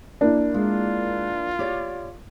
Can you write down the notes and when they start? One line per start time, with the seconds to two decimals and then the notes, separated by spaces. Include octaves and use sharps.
0.21 A#3 D4 E4
0.54 G#3 F4
1.59 G4 C#5 D5